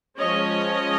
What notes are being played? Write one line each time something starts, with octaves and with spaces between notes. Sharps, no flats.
F3 G#3 C#4 C#5 D#5